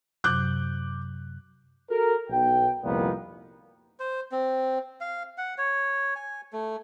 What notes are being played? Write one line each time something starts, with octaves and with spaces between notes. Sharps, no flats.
F#2 C3 F#3 D6 F#6 G6
F#4 A4 A#4
B1 G5
C2 F2 A#2 D#3 B3
C5
C4
F5
F#5
C#5
G#5
A3